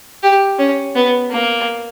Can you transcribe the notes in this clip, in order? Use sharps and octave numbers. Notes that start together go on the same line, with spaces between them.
G4
C#4
B3
A#3